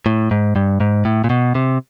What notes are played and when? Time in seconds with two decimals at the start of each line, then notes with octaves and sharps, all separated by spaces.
0.06 A2
0.31 G#2
0.56 G2
0.80 G#2
1.05 A2
1.24 A#2
1.30 B2
1.55 C3